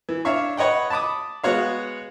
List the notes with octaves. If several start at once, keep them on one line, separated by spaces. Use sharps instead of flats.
E3
D4 C#5 E5 F5 C#6
B4 C#5 D#5 F#5 G5
A5 B5 D6 D#6
G#3 B3 F#4 C#5 F5